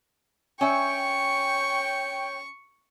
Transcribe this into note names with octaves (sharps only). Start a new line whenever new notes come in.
C#4 C#5 E5 G5 C#6